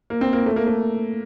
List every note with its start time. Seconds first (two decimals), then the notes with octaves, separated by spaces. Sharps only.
0.10 A#3
0.21 C4
0.33 A#3
0.46 A3
0.56 A#3
0.67 A3